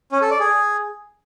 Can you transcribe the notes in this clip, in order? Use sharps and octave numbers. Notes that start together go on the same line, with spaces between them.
C#4
A4
D5
G#4